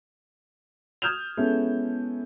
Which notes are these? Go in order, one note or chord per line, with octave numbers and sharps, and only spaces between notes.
D#6 F6 G6 G#6 E7 F7
G#3 B3 C#4 E4 A4